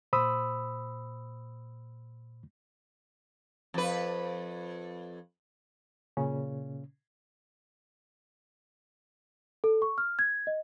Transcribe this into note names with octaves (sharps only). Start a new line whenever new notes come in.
A#2 C5 B5 D#6 E6
F2 B4
A#2 C#3 C#4
A4
C#6
F6
G#6
D#5